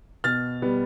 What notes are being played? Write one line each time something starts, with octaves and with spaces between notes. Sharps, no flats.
B2 F6 A6
G3 B3